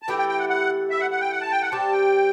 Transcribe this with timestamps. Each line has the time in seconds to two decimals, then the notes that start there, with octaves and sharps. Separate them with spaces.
0.02 A5
0.08 E3 A3 E4 G4 G5
0.18 G5
0.29 G5
0.39 F#5
0.49 F#5
0.90 E5
1.00 F#5
1.11 F#5
1.21 G5
1.31 F#5
1.41 A5
1.52 G5
1.62 F#5
1.72 G3 C4 G4 A5
1.92 G5